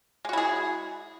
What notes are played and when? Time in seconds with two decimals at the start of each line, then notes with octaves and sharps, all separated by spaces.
0.25 G#3
0.29 F#4
0.33 E4
0.38 G#4